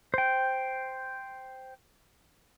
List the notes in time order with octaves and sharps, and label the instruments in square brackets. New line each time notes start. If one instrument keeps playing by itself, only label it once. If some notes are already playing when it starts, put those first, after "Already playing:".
[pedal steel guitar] C5 G5